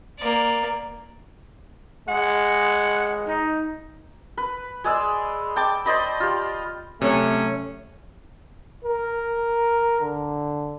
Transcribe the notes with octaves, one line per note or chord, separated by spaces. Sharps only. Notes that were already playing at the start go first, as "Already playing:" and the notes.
A#3 D5
G#3 F#5
D#4
B4
G#3 G#4 D5 E6
G5 A5 D6
C5 D5 D#5 B5
F4 G4
C3 F#3 A3 C#4 C#5 E5
A#4
D3